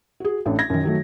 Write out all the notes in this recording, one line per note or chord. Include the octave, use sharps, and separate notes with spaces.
F#4 G#4
A1 A2 D4
G#6 A#6
F#2 D#3
D#3 F#3 A3